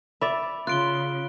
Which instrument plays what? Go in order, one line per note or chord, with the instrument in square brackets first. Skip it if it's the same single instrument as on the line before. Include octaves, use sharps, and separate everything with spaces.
[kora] D5 E5 [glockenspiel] B5
[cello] C#3 [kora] F4 [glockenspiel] F#6 D7 G7